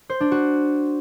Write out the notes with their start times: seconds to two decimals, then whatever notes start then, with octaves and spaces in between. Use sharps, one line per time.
0.09 C5
0.20 D4
0.32 F#4